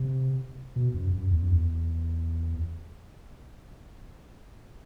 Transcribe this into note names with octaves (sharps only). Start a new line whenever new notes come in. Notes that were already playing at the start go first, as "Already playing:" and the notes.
Already playing: C3
B2
F#2
F#2
E2
F#2
E2